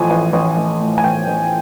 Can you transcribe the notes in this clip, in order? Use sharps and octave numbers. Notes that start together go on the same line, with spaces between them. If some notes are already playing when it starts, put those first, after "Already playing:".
Already playing: A1 A2 F3 G#5
A1
A1
A1
A2
G#5
A1 G5
A1